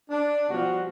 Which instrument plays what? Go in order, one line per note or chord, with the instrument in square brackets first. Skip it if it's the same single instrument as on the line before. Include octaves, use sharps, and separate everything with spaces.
[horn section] D4
B2 F3 G3 F#4